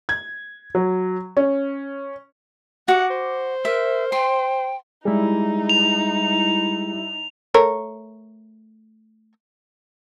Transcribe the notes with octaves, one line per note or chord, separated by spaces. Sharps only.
G#6
F#3
C#4
F#4 F#5 D6
C5
A#4 E5
G5 C6
G3 G#3 D#4 E4 G#4
F7
A3 A#4 C#5